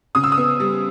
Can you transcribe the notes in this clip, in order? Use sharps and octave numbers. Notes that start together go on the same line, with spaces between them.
C#3 D#6
E6
D#6
B3
G3